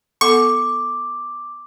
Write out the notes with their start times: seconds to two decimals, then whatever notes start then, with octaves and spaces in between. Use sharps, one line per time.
0.21 B3 A4 F#5 C#6 D6